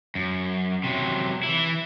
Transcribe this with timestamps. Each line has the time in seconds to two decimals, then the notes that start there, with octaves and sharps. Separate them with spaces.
0.15 F#2
0.84 C3 F#3
1.43 E3 E4